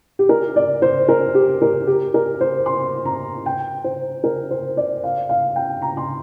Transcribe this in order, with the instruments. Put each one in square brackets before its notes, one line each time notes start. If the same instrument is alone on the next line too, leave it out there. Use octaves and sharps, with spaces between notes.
[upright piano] G4
A#4
D5
C5
A#4
G4
A#4
G4
A#4
C5
C6
A#5
G5
C5
A#4
C5
D5
F5
F5
G5
A#5
C6